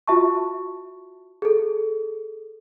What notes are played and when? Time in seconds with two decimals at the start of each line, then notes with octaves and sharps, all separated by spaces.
0.08 F4 F#4 E5 A5 C#6
1.42 G#4 A4